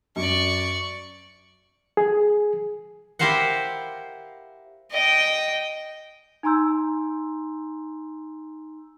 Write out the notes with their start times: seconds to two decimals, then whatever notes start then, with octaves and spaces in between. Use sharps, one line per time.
0.16 F#2 D5 C#6
1.97 G#4
3.19 E4 G4 A#4 C5 F5 F#5
4.92 D#5 G5
6.43 D#4 G#5 A#5 C6 E6 G6